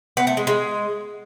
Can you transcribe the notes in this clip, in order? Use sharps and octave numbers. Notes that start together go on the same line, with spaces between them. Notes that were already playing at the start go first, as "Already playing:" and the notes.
B3
A3
G#3
G#3